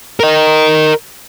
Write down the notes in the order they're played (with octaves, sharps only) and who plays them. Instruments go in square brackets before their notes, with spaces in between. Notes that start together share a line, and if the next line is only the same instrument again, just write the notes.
[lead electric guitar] A#4 D#5